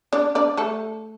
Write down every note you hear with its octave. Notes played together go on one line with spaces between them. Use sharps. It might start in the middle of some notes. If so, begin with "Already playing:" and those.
D4 D5
D4 D5
A3 A4